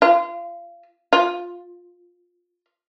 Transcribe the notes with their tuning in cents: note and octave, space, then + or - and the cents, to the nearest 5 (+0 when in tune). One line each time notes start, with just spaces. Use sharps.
F4 -30
F4 +15